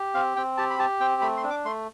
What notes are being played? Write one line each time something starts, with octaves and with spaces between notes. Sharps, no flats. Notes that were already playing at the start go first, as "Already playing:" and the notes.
Already playing: G4
C4 F5
C4 G5
G4 A5
B5
G4 A5
C4 G5
A3 B5
C6
D4
D6
A3 C6